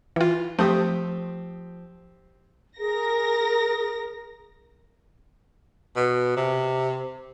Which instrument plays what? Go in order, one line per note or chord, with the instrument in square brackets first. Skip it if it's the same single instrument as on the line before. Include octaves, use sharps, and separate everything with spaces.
[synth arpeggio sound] E3 F4 [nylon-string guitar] G5
[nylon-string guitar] F3 [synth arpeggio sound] A3 [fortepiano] C4 G4 D#6
[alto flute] G#4 [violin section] A#4 A#6
[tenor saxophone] B2
C3